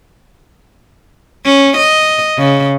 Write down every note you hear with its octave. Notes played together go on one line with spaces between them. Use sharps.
C#4
D#5
C#3